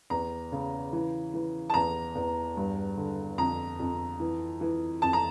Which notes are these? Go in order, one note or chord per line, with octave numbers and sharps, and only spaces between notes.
E2 A#5
C#3
E3
E3
A5
E2 A#5
E2
G2
D3
F2 A#5
F2
E3
E3
F2 A5
A#5